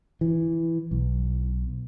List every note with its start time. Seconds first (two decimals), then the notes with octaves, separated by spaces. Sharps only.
0.21 E3
0.91 B1